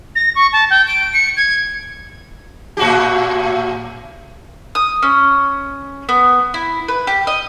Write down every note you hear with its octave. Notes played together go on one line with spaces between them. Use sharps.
A#6
C#6
A5
G5
D7
C#7
G#6
A2 F#4 G4
D#6
C#4
B3
E4
B4
G4
D#5